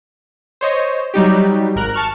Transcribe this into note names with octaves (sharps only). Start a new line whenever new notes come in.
C5 C#5 D#5
F#3 G3 D#4 G4
G#1 A#4 F#6
A5 C#6 F6